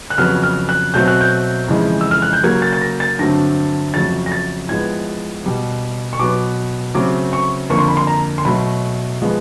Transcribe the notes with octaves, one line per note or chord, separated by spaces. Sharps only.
F#6
F2 C#3 F#3 B3 F6
F6
F#6
B2 F#3 A3 C4 G6
F#6
G6
F2 C#3 E3 G#3
E6
F6
F#6
G6
C#3 F#3 A#3 G#6
A6
A6
A#6
A6
G2 D3 F#3 A3 C4 A#6
F2 C#3 F#3 A3 A6
A#6
A6
A2 F3 G#3 B3 G#6
B2 G3 B3
C#6
B2 F#3 B3 D6
C#3 F#3 A3 C4 D6
C#6
F2 D3 F3 A#3 C#6
C6
B5
C6
A#5
C6
B2 F#3 A3 B5
F3 G#3 B3